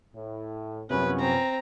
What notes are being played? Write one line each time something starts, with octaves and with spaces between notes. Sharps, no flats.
A2
F#2 C3 F3 B3 C#4 B4
C4 A#5